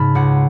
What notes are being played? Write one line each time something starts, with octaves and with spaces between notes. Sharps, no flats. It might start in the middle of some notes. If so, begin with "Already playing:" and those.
Already playing: G#2 C#3 A5 B5
C#2 F#5